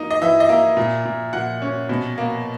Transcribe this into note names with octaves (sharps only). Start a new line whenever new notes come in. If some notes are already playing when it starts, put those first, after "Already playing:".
Already playing: A#3 D#4
D#5
E3 E5
D#5
A#3 E5
A#2
A#2
A#2 F#5
C#4
B2
A#3